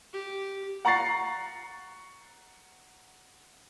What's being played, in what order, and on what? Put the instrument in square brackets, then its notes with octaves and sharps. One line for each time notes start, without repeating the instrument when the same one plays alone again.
[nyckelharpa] G4
[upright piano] F#5 A#5 C#6 A6 C7